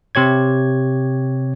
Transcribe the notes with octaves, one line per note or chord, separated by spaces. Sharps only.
C3 G4 C#5 G#6